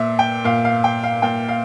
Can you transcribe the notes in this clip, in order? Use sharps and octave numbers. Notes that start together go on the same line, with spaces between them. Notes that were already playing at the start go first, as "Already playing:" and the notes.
Already playing: A#2 E5
G5
A#2 F5
F5
G5
F5
A#2 G5
F5